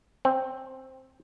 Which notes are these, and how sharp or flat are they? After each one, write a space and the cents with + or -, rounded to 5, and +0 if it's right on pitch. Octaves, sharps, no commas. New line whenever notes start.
C4 +5